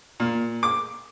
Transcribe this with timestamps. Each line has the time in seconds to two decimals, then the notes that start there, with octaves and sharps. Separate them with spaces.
0.20 A#2
0.63 D6